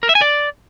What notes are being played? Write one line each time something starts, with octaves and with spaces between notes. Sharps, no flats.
A#4
E5
G#5
D5